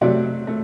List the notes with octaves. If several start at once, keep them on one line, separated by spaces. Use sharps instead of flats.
C3 F#3 A3 D5
A3